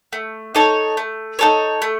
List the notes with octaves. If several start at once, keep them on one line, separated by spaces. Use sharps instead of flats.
A3
D#4 A4 C#5
A3
D#4 A4 C#5
A3